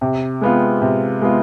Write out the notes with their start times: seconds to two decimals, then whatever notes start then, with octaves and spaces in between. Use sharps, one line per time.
0.01 C3
0.41 G#3 B3 F4
0.82 C3
1.22 G#3 B3 F4